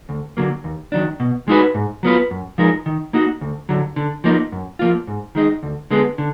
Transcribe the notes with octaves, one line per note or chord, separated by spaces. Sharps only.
D2
D3 F#3 A#3
D#2
D#3 F#3 D4
B2
G#3 D#4 F#4 B4
G#2
F#3 B3 F4 B4
F#2
F3 G#3 D#4 A#4
D#3
A#3 D#4 F#4
D2
D3 F#3
D3
F3 A#3 D#4
F#2
F3 A#3 F4
G#2
D#3 G#3 D#4
D2
D3 G#3 B3
D3